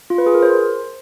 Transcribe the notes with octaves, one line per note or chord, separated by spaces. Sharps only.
F4
B4
G#4
A#4
C5